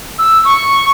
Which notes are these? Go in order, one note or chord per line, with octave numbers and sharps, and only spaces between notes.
E6
C#6